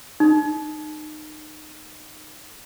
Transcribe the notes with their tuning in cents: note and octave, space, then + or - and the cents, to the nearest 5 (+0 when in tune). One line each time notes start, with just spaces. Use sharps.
D#4 -25